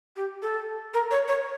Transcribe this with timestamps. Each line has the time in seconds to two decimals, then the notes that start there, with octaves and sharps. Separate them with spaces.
0.16 G4
0.42 A4
0.94 A#4
1.11 C#5
1.28 C#5